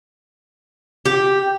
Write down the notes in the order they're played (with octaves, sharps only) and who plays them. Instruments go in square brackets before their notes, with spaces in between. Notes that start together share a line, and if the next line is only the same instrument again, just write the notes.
[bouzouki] G4